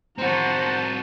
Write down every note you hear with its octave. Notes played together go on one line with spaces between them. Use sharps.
C4 F#4 C5 F#5 A5 A#5